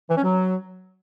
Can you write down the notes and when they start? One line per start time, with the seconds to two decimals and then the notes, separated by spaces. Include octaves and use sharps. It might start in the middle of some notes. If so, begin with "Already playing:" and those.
0.09 E3
0.16 C#4
0.23 F#3